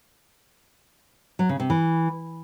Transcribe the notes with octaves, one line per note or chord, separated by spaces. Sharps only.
F#3
C#3
C3
E3